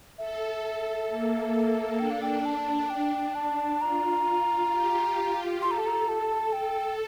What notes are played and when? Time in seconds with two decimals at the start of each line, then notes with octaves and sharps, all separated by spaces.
0.18 A4 E5
1.09 A#3
1.54 A#3
1.99 D4 G5
2.11 F5
2.22 G5
2.46 A5
2.90 G5
3.35 A5
3.81 F4 A#5
4.71 G4
5.62 A4 C6
5.71 A#5
5.79 A5
5.86 A#5
6.09 A5
6.53 A4 G5